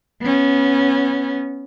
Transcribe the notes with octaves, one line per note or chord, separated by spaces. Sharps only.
B3 C#4